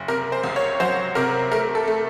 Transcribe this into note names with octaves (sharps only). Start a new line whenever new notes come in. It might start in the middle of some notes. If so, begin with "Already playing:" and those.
Already playing: F#1
C3 A#4
C5
C#2
C#5
F#3 C5
C3 A#4
A3 A#4
A4
A3